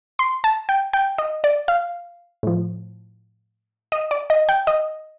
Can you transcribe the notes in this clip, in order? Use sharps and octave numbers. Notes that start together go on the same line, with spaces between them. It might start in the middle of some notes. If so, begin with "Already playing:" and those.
C6
A5
G5
G5
D#5
D5
F5
A2 F3
D#5
D5
D#5
G5
D#5